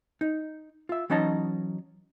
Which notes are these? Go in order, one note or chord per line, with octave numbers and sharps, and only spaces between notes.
D#4
F4 E5
E3 F#3 C#4 D#4 D#5 A5